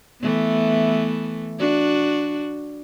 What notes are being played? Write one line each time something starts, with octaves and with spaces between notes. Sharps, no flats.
E3 A3 B3
D4 F#4